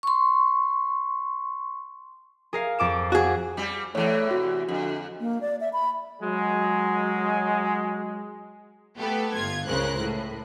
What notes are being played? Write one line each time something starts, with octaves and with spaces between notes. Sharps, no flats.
C6 C#6
G#4 A#4 F5
F2 D6 E7
F#4 G#4
G3 C4
E2 E3 A3 C#5
C3 F#4
F2 D3
A#3
D5
E5
B5
F#3 G#3
A3 B3 G4 A4 B4
G1 F4 G#6
C#2 C#3 A#4 C5 F#6
A2